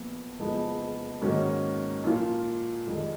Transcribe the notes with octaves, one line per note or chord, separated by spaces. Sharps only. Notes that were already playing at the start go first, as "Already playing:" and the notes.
Already playing: A#1 A#2 F3 B3
F#1 F2 F3 G#3 B3
G#2 D#3 F#3 A#3 C#4
A#2 F3 A#3 F4
F1 F2 D#3 G#3